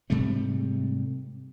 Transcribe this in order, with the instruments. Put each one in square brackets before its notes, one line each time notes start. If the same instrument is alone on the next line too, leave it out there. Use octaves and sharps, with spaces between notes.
[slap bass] G#2 C3 G3 A3